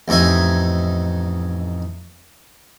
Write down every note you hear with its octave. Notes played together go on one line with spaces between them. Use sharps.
A1 F2 D#4 E5 G#5